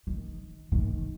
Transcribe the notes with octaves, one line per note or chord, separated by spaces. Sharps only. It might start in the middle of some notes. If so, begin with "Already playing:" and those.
D#3
D#3